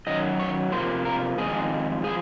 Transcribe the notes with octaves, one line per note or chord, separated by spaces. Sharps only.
F#2 D#3 F#3 D#5
C#5
C3 F3 A#3 C5
A#4
F2 D#3 G#3 G#4
F3 G#4